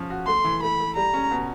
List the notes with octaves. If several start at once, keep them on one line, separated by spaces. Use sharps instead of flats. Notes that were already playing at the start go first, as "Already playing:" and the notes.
Already playing: F3 C#4
F#4
A3 C6
E3
A3 B5
A3
G3 A#5
C#4
B2